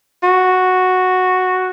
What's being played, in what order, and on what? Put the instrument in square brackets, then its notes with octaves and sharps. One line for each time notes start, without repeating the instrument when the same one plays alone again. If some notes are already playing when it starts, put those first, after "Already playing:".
[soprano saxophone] F#4